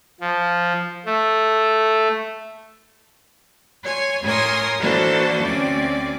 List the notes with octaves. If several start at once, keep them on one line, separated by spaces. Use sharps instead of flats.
F3
A3
C#5 G#5 C6
A2 A#4 C#5 G#5 C6 D#6
E3 A#3 D4 F#4 A4 C5
D2 C4 C#4 D5